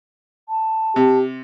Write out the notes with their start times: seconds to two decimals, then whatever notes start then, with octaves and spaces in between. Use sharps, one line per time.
0.48 A5
0.96 C3 G4